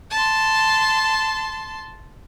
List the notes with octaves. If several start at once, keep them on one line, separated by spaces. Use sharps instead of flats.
A5 C6